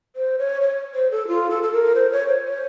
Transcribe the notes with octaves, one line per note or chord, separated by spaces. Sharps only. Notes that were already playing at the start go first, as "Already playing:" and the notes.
C5
C#5
C#5
C5
A4
F4
A4
A4
A#4
C5
C#5
C5
C#5